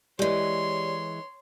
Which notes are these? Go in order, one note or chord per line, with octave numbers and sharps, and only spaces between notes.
E3 G#3 G4 C#5 D5 C6